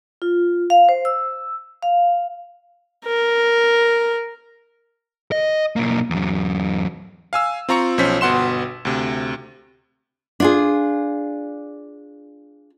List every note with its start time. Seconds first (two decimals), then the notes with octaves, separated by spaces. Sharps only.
0.22 F4
0.70 F5
0.89 C5
1.05 E6
1.83 F5
3.05 A#4
5.32 D#5
5.76 B1 A#3
6.11 E2 F#3
7.33 F5 G#5 E6
7.69 C4 F4 A#5 C#6 C#7
7.98 B1 F3 C#4 C5 B6
8.21 G1 B2 F#5 C6 E7
8.85 D2 C3
10.40 D4 F4 G#4